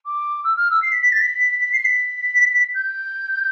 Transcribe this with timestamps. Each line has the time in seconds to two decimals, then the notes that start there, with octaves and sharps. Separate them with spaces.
0.05 D6
0.44 E6
0.57 F6
0.70 E6
0.82 C7
0.92 B6
1.02 B6
1.12 A6
1.21 B6
1.60 B6
1.73 C7
1.85 B6
2.74 G6